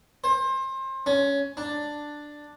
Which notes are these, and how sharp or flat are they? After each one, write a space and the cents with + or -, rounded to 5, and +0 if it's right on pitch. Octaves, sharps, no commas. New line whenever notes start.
C5 +30
C#4 +15
D4 +5